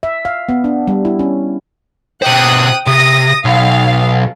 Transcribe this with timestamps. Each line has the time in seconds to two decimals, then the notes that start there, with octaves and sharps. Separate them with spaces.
0.03 E5
0.25 F5
0.49 B3
0.64 D4
0.88 G3
1.05 E4
1.19 C#4
2.22 B2 C5 G5 D#6 F#6
2.87 C3 D#6 A#6
3.45 B1 F5